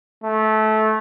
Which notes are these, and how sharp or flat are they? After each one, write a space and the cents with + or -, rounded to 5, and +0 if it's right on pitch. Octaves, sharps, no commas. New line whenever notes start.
A3 -20